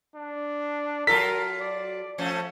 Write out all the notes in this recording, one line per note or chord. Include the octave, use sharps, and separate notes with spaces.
D4
F#3 F4 A4 A#4 B6
D5
F3 A3 C#4